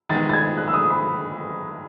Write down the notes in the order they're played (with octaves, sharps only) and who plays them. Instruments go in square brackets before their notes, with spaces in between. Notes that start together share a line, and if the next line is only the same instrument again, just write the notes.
[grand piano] D#3 G#3 B3 [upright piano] A6
[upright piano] A6
G#6
F#6
E6
D#6
B5